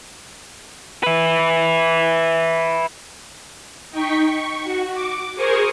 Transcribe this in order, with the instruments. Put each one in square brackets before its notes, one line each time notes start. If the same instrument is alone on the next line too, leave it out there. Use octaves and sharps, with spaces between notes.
[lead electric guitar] B4 E5
[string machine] D#4 G5 C#6 B6
C#6
F#4
D6
G#4 A#4 C5 G#5 C#6 D#6